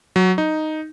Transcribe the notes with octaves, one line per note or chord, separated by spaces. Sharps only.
F#3
D#4